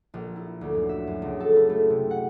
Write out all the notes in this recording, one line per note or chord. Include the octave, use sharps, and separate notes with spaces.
A#1
E4
D2
F#2
E5
F#2
C#2
A4
E4
A3
C3
F#5